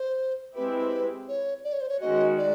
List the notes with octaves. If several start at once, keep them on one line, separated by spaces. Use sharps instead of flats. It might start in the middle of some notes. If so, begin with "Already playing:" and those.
Already playing: C5
G#3 C4 E4 G4 B4
C#5
D5
C#5
C5
C#5
D#3 G#3 C#4 F#4 D#5
D5